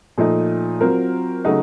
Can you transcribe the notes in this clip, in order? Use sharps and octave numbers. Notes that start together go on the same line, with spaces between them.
A#2 F3 A3 D#4
F#3 C4 F4 A#4
C#3 F#3 A3 D#4 F#4